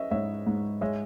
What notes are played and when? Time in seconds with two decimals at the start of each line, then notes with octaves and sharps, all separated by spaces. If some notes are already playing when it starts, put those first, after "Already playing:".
Already playing: C#4 B4 C#5 D#5 E5
0.11 G#2 C#5 E5
0.47 G#2
0.81 G#3 C#5 E5